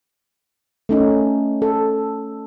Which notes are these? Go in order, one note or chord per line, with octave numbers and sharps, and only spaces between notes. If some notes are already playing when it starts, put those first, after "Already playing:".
A3 C#4 D#4
A4